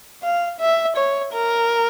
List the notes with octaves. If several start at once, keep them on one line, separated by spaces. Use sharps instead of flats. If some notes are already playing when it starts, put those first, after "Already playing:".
F5
E5
C#5
A#4